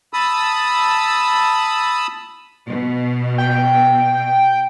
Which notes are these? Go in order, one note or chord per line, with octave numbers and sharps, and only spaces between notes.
A5 B5 D#6 E6
B2
G5